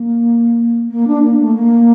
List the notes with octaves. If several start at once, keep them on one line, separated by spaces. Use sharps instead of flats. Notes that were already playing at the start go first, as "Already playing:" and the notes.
Already playing: A#3
A#3
D4
A#3
A3
A#3